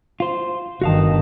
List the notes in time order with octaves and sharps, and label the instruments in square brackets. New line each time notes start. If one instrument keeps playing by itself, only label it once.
[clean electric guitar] F4 C5
[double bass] G1 D#3 [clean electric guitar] F#4 F5 A5